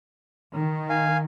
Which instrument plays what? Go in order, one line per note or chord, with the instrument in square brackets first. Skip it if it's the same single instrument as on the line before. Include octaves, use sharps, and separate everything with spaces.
[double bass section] D#3
[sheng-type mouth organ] F5 G#5